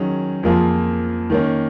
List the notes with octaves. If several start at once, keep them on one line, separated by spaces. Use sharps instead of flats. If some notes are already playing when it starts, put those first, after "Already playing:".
Already playing: D#3 F#3 C#4 G#4
F2 F3 A#3 F4 G#4
D#3 A#3 C#4